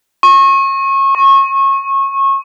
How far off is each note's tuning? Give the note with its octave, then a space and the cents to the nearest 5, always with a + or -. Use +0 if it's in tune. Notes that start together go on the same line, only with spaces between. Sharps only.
C#6 -30
C#6 -25